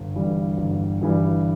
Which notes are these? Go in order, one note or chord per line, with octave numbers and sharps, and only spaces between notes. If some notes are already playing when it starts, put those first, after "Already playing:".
Already playing: G1
G2 E3 G3
G1
G2 E3 G3